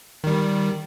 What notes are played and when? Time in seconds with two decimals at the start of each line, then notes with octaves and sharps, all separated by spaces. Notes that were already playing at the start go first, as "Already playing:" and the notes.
0.24 D#3 G3